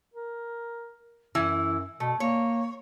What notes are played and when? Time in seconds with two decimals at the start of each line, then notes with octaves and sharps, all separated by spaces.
0.14 A#4
1.35 F#2 E3 E4
2.00 B2 A3
2.20 A#3 C#5